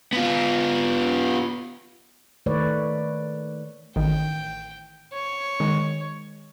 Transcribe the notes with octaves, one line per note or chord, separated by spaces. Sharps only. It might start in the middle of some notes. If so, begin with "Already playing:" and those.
B3 F4
D#3 A3 B4 C#5 D5
A1 D#3 G5
C#5
D#3 G#3